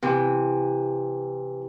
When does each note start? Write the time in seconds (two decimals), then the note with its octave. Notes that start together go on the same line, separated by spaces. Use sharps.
0.03 C3 E3